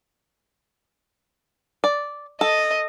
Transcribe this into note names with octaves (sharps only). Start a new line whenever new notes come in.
D5
A4 D#5